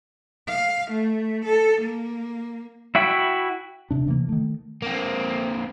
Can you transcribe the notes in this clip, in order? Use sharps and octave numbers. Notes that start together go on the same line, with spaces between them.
F5
A3
A4
A#3
E4 F#4 E5 G5 B5
D#1 C2 C3 D4
C3 E3 F3 A#3
D#3 A3
A#3 C4